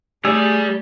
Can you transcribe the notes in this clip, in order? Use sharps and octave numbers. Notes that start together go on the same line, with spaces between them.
G3 A3 G#4 D5 E6